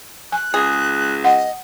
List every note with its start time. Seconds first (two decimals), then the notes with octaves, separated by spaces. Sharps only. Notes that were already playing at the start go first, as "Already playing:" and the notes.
0.32 G#5 F#6
0.54 C#2 G#4
1.24 D#5 F#5